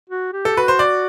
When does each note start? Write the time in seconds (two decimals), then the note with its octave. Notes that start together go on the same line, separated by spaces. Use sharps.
0.10 F#4
0.33 G4
0.45 A4
0.56 F#4 B4
0.68 C5
0.79 D5